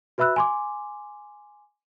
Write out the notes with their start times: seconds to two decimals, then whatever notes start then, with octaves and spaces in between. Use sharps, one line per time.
0.18 F#4 B4 E5 B5 E6 F#6
0.36 G#5 C6 D6